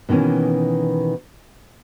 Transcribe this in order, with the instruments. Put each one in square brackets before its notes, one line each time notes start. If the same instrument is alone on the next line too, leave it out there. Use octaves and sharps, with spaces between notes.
[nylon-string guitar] B2 D#3 E3 A#3 C#4